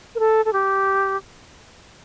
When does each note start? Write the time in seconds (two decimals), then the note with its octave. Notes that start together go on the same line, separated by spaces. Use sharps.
0.15 A#4
0.19 A4
0.45 A4
0.53 G4